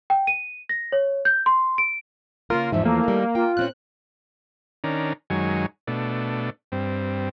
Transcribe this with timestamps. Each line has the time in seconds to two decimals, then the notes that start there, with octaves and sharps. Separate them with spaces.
0.10 G5
0.27 D#7
0.69 A#6
0.92 C#5
1.25 G6
1.46 C6
1.78 D7
2.50 C#3 A#3 F4 A#4
2.72 E2 G#2 E3 F3 E5
2.85 A3 A#3
3.04 D#3 G3
3.35 F4 G5
3.57 A#2 C4 C#4 F#6
4.84 D#3 C#4 D4 A#4
5.30 F#2 D#3 F#3 G#3 G#5 C#6
5.87 B2 A3 D4
6.72 G2 C4